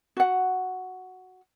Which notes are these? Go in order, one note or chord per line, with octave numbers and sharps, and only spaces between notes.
F#4 F#5